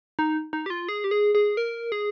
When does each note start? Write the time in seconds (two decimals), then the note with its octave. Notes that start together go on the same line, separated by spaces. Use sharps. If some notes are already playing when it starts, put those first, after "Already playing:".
0.19 D#4
0.53 D#4
0.66 G4
0.70 F4
0.89 G#4
1.04 G4
1.11 G#4
1.35 G#4
1.57 A#4
1.92 G#4